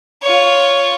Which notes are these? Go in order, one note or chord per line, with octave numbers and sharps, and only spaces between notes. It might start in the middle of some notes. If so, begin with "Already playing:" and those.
F4 C#5